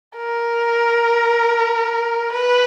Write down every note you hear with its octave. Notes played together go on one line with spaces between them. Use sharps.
A#4
B4